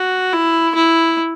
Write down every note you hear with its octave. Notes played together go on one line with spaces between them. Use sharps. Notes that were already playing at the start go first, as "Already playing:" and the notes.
Already playing: F#4
E4
E4